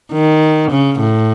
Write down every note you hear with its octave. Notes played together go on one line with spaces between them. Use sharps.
D#3
C#3
A2